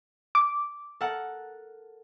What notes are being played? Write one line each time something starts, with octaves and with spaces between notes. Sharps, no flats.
D6
A4 A#4 F#5